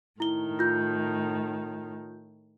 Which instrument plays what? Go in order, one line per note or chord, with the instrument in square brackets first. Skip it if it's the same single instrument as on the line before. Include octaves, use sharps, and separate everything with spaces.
[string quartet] A2 D#3 [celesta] E4 G7
[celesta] F4 G6